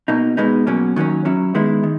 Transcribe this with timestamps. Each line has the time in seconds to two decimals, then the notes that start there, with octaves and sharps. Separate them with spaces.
0.08 B2 A#3 D#4
0.37 B2 G#3 B3 D#4
0.67 B2 F#3 A#3 C#4
0.96 D#3 F#3 A#3 C#4
1.25 F#3 C#4 E4
1.55 D#3 G#3 B3 E4
1.83 D#3